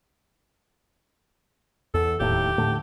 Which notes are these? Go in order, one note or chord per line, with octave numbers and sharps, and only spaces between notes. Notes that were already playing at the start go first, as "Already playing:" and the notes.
E2 A4
D1 D#2 A2 G4
A2 D3 A3